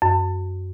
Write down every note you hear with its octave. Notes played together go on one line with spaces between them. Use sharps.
F#2